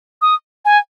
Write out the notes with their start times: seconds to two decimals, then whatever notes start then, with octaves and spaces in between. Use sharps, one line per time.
0.22 D#6
0.65 G#5